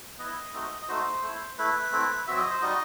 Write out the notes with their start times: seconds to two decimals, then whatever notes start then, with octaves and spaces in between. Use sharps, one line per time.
0.19 B3 E4 D#5
0.53 A3 C4 D#4 F#4
0.82 D#5
0.88 A3 D#4 F#4 C5
1.22 A3
1.28 E4
1.58 A3 E4 B4
1.92 A3 C4 E4
2.27 F#3 C4 F#4 E5
2.38 D#5
2.50 C5
2.61 G3 D#4 F#4 D#5